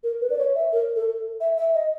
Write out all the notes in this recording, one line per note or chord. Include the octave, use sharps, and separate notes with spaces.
A#4
B4
D5
C#5
E5
A#4
A4
E5
E5
D#5